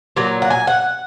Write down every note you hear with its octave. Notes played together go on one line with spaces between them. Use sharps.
A#2 F#3
F#5
G#5
F#5